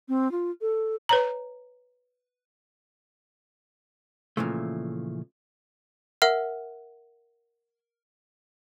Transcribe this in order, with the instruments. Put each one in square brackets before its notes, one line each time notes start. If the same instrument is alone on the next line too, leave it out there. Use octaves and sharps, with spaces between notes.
[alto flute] C4
F4
A4
[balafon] B4 C#5 A#5
[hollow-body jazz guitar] A#2 C#3 E3 F3 A3
[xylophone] A#4 E5 F#5 F6